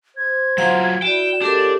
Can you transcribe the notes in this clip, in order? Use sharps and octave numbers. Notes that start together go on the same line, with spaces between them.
C5 G#6
F#3 F4 F5 F#5 A#5
E4 F#4 D5 G5 E7
C#2 D4 G4 A4 A#4